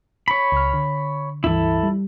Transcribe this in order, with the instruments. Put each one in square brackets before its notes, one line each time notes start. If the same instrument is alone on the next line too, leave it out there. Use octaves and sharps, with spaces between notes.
[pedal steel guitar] C#5 B5
[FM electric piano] C#2 F6
D3
[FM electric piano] C#2 G2 E3 [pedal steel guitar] E4 A4
[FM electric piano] G3